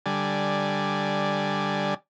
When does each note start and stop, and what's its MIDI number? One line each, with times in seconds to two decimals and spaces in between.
0.06 1.94 50
0.06 1.94 55
0.06 1.94 74
0.06 1.94 80